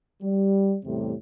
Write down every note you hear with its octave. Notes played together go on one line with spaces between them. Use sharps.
G3
E2 A2 C3 G3 A3